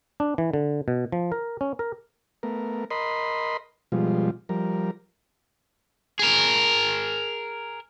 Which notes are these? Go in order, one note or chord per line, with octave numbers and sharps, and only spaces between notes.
D4
E3
D3
B2
F3
A#4
C#4
A#4
A3 B3 A#4
A#4 D#5 B5 C6
B2 F3 G3 G#3 F4
F3 G3 A#4
G#4 A#4